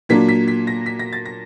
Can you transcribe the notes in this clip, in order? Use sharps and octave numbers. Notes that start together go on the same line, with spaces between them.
A#2 F#3 A#3 D4 B6
B6
B6
A#6
B6
A#6
A6
A#6